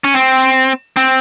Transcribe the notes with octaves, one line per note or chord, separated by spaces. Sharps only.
C#4
C4
C4